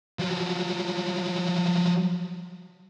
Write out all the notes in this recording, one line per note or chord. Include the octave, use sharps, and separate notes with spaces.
F3 F#3